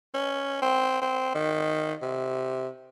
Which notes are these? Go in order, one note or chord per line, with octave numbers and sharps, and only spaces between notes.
C#4
C4
C4
D#3
C3